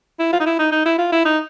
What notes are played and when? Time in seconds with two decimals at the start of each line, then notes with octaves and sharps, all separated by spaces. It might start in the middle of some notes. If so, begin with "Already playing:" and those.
0.20 E4
0.32 F4
0.40 D#4
0.46 E4
0.59 D#4
0.72 D#4
0.86 E4
0.99 F4
1.12 E4
1.25 D#4